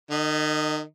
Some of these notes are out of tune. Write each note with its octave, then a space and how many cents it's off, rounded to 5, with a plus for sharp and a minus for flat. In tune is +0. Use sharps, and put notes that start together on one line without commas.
D#3 -35 D#5 +0